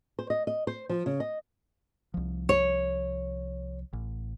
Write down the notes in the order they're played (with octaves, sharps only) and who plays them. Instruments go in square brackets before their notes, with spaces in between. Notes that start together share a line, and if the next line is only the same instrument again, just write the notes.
[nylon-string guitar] C5
D#5
D#5
C5
F3
C#3
D#5
[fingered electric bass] C2 F3
[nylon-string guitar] C#5
[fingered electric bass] A1